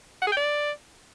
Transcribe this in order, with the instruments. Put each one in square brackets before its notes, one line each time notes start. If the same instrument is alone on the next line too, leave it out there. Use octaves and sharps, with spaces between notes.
[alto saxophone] F#5
G#4
G5
D5